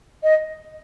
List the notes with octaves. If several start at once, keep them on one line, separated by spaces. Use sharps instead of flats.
D#5